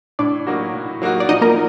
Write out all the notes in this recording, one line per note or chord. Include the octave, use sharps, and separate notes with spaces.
A2 D4 D5
F#3 A#3 D#4 F#4
A2
F#3 A#3 D#4 F#4
D5
F3 D#4 D#5
A#3 A#4